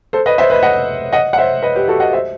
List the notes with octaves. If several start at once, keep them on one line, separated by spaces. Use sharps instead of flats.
A4 C5
B4 D#5
C5 E5
B4 D#5
D#5 F#5
D#5 F#5
F#5
C5 E5
B4 D#5
G4 B4
F#4 A4
D#5 F#5
C5 E5